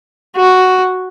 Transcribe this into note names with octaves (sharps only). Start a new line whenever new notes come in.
F#4